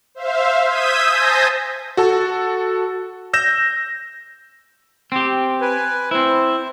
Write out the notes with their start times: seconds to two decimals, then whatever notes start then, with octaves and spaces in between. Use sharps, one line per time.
0.15 C5 E5 F5
0.67 D#6 E6 G6 G#6 B6 D#7
1.09 C5 G#5 A5 D#6 G6 A#6
1.97 F#4 A4 A5
3.33 E6 G6 A#6 E7
5.12 C4 G4
5.61 B4 G#5
6.11 C4 E4 C5